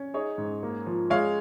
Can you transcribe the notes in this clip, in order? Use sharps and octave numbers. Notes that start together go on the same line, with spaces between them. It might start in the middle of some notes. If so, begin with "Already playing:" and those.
Already playing: C#4
D#4 G#4 C#5
G#2
A#3
F3
G#3 C#5 F5